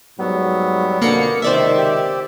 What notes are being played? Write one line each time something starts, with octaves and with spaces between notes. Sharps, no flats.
G#2 F#3 G3 B3
F2 B2 D3 A#3 C#7
C#2 C3 D#3 C5 D5 E5
G4